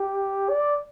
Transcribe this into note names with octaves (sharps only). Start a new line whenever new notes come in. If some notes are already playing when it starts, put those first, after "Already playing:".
Already playing: G4
D5